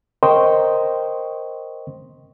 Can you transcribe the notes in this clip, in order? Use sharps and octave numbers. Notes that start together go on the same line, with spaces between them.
A#4 C5 D#5 G5 C6 C#6